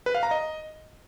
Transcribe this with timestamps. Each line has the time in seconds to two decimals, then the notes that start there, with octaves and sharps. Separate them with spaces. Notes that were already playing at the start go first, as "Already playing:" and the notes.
0.06 B4
0.15 F5
0.23 A#5
0.31 D#5